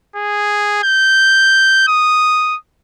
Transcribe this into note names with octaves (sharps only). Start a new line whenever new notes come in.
G#4
G6
D#6